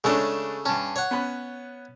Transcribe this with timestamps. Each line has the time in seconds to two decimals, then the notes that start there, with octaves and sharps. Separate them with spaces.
0.04 C#3 G#3 A3 C#4 D4 A4
0.66 G2 C#4 A5
0.96 C#5 F#5
1.11 B3 C#4 B5